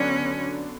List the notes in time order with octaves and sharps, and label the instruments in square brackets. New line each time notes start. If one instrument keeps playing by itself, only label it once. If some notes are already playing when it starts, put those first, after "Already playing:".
Already playing: [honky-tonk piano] D3 F#3 B3 D4 [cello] C#4